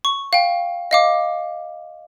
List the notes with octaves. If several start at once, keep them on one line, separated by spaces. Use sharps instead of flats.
C#6
F5 G5
D#5 F5 D6